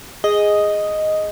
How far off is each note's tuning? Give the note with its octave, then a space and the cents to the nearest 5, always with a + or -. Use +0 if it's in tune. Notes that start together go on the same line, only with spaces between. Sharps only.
G#4 -5 D#5 +0